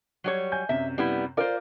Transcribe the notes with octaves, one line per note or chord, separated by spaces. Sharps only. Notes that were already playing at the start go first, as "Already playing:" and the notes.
F#3 G3 C#5
G#5 G6
F#2 C3 E5
G3 B3 E4
F4 A#4 C5 D5